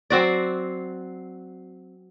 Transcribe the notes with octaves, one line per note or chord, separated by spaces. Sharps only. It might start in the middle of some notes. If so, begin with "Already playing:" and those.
F#3 C4 F#4 D5